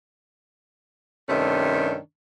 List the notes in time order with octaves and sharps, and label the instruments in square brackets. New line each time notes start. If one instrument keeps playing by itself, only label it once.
[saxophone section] G2 C3 D#3 A3 C#4 D4